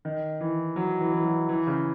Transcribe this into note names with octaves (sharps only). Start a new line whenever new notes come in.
D#3
E3
F#3
E3
E3
F#3
E3
C#3